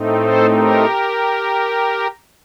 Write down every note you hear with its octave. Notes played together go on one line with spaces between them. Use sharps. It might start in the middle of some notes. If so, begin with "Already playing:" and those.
Already playing: A2 A3 C4 D#4
A4 C5
G4 A#4